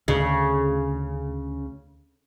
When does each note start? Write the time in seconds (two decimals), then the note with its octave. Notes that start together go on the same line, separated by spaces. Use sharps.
0.08 D2 C#3